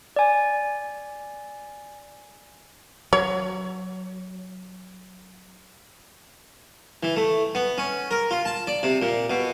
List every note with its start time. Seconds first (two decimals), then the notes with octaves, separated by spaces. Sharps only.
0.16 D5 G#5
3.13 F#3 C#5
7.03 E3
7.16 A3
7.55 B3
7.78 C#4
8.11 A#4
8.31 F4
8.45 A5
8.67 D5
8.83 C3
9.02 A#2
9.30 B2